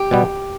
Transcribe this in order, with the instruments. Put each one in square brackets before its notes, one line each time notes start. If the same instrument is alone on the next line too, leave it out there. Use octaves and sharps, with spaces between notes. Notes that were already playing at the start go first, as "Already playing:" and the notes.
Already playing: [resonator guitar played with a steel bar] G4
[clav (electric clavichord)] B2 G3 B3